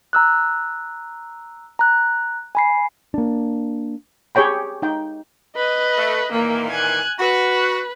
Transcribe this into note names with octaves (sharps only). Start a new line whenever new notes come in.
A#5 E6 F#6
A#5 F#6
G#5 B5 C7
A#3 D4
G4 G#4 C#5 G5 B5
D#4 G5
B4 D#5
A3
A#2 D#3 E3 A#3
G#5 F#6
F#4 B4